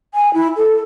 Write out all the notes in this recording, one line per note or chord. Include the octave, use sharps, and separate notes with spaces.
G#5
E4
A4